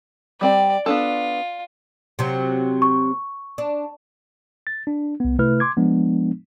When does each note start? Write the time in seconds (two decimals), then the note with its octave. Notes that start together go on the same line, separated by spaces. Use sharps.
0.41 G3 C4 D5 G5
0.86 B3 D4 F4 A4
2.19 C3 F#3
2.82 C#6
3.58 D4
4.67 A6
4.87 D4
5.20 C2 B3
5.39 C3 A3 E4 B4 F6
5.60 C6 D6 G#6
5.77 F3 G#3 B3 D4